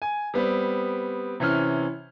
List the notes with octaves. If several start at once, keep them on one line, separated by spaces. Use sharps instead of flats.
G#5
G3 B3 C4
C3 E3 C#4 F6